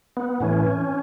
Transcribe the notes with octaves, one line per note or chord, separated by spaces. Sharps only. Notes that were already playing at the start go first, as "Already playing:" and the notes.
B3
A2 E3 C#4